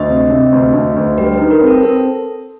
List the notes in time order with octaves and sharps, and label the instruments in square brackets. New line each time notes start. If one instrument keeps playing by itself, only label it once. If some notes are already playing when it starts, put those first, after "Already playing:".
Already playing: [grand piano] D2 [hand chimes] D#5
[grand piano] C3
C3
D2
D2
D2
[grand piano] G3 [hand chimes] B4
[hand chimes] B4
[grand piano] D#4
[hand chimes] A#4
[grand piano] C4
[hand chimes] A4
[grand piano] C4 [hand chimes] A4